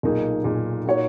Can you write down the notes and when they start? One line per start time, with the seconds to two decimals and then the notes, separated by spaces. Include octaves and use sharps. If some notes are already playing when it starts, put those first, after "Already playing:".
0.03 B1 A#2 A#3 D#4 G#4
0.44 B1 A#2 A#3 D#4 G#4
0.86 A#2 A#3 D#4 F#4 C#5